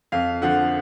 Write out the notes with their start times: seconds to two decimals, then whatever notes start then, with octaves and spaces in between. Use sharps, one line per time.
0.12 F2 F5
0.42 D3 F3 F#5